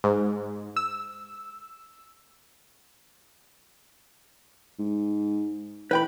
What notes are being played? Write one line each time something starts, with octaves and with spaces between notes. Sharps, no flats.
G#2
E6
G#2
E3 B4 G5 B5